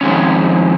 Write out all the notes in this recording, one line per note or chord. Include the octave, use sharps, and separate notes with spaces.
F2 D#3 G#3 C#4